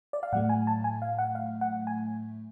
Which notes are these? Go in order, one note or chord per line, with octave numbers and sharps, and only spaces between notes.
D5
F5
A2 F#3 A3 F#5
G#5
A5
G#5
F5
F#5
F5
F#5
G#5